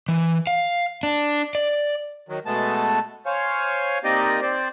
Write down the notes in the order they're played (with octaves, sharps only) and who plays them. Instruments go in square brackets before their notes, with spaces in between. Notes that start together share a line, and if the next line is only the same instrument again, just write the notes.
[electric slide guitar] E3
F5
D4
D5
[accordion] D#3 F#3
B2 G#3 A3 B3 A5
C5 C#5 F5 G#5
A#3 C4 D#4 G4 D5 D#5
C4 C5 D5